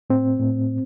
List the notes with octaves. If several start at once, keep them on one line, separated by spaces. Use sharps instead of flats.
A2 C4
A2